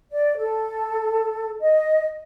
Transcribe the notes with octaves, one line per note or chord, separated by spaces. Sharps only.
D5
A4
D#5